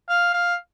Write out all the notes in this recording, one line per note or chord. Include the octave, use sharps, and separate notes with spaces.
F5
F5